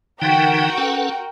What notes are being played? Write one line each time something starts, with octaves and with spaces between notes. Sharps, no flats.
D3 E3 D#4 F#4 A#4 G5
C#4 A4 B4